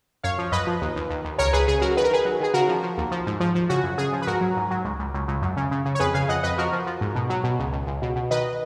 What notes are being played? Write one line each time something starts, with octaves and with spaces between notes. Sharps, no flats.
F#2 C#5 F5
F3
F#2 B4 D#5
F3
D#2
D#2
D#2
D#2
C#2 A#4 C#5
C#2 G#4 B4
C#3 G#4
F#3 F#4 A#4
D#3 B4
A#4
D#3 G#4 B4
F#3
D#3 G#4
C#3 F#4 A#4
F3
F3
D#2
F3
G#2
F3
F3
C#3 F#4
F#2
C#3 G#4
F3
B4
G#2 F#4 A#4
F#3
G#2
F#3
C#2
C#2
C#2
C#2
F#2
C#3
C#3
C#3
C#5
F2 G#4 B4
C#3 F5 G#5
F2 D#5 F#5
F2 B4 D#5
F3 F#4 A#4
F3
F3
G#2
B2
F#3
B2
C#2
C#2
C#2
B2
B2
D#3 B4 D#5